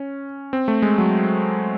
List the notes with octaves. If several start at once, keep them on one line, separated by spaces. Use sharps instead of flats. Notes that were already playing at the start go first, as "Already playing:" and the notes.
Already playing: C#4
C4
A3
G#3
F#3